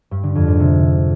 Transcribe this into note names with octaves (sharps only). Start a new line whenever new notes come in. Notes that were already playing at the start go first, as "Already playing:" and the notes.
G2
D3
F2
G#2
C3